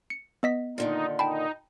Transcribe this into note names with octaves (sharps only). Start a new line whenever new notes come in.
C#7
B3 D#5 B6
A#2 D3 D#3 D#4
D#4 G5 A5 B5